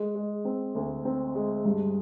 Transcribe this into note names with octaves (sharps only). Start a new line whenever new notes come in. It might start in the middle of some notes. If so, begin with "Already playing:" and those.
Already playing: G#3
G#3
C4
D2
C4
G#3
G2